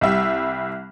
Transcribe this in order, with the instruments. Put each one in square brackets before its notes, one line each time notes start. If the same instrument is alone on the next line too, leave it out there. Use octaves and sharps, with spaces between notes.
[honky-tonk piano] C2 G3 E5